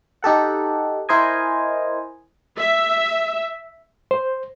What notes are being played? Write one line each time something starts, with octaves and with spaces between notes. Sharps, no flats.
D#4 G4 A4 F#5
E4 A#4 C5 D#5 G#5
E5
C5